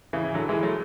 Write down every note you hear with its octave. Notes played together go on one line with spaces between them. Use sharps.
C#3 E3
E3
D3 F#3
E3 G#3
F#3 A3